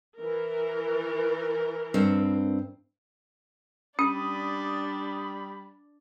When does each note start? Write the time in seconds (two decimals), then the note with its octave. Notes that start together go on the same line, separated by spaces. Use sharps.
0.17 E3 A#4
1.94 G2 C4
3.99 G3 C#4 D4 D5 B5 D#6